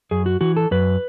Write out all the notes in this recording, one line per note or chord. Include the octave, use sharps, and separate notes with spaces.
F#2 G#4
F#4
E3 F#4
A4
F#2 B4